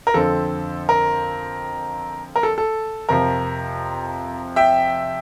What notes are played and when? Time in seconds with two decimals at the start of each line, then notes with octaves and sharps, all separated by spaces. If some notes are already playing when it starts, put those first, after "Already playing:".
0.07 A#4
0.14 F2 D3 F3 C4 A4
0.89 A#4
2.36 A#4
2.43 A4
2.58 A4
3.09 F2 C3 F3 A#4
4.56 E5 G5